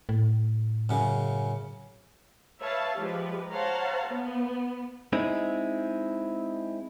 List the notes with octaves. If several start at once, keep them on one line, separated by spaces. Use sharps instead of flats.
A2
F#2 C#3
B4 C#5 E5 F5 A5
F3 G#3 G4 B4
C5 C#5 F5 F#5 A5 A#5
B3
G#3 C4 D#4 E4